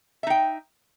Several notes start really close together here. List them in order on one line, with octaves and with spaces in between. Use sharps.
E5 D#4 G5